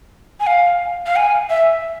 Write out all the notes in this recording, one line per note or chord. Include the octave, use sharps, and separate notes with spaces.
G#5
F5
F5
G#5
E5